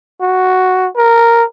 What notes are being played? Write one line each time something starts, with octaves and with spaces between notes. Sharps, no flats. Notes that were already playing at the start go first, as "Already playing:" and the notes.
F#4
A#4